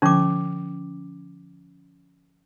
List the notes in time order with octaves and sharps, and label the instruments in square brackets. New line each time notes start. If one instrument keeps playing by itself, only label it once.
[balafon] D3 F3 [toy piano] C#4 D6